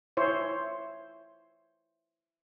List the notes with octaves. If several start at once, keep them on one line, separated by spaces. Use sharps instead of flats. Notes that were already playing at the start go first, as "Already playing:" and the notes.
E4 C5 C#5